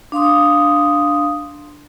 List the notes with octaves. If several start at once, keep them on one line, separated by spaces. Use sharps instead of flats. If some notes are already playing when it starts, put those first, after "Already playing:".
D4 F5 C6 D#6